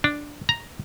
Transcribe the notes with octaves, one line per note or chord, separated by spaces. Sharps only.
D4
A#5